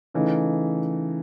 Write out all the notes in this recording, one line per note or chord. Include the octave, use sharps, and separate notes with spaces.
C#3 E3 A3 D#4